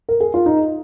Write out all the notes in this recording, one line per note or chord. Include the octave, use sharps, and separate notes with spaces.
A#4
G#4
F4
D#4